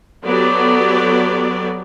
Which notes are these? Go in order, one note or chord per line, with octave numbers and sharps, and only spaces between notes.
F#3 B3 G4 A4 D5